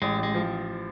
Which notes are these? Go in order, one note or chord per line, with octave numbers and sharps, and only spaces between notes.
A1 G#3
A1
G#3
F3